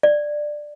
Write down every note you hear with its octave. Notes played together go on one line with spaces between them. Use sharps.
D5